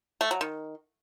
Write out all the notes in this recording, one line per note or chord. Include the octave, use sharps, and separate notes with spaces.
A3
F#3
D#3